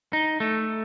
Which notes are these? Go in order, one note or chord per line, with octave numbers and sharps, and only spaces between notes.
D#4
A3